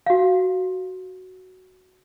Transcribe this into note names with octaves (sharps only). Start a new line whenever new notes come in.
F#4 F5